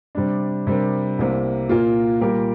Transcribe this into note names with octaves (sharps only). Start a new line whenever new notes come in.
C3 G3 D4
C3 G3 D4 A#4
C2 C3 A#3
A#2 A#3 F4
A#2 G3 A#3 G4 A#4